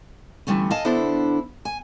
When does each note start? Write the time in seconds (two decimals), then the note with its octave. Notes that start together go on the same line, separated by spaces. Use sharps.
0.47 D3 E3 G3 A3 C#4
0.70 A4 D#5 F5 G#5 A5
0.84 D3 B3 D4 E4 A4 C5
1.65 G#5